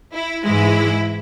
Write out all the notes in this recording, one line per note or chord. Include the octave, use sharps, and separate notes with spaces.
E4
G#2 E3 G#3 E4